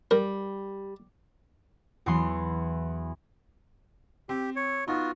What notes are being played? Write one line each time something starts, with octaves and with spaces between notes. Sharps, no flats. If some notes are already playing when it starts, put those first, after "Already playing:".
G3 A#4
E2 E3 F#3 B3 C6
C4 G4
C#5
B3 D#4 F4 F#4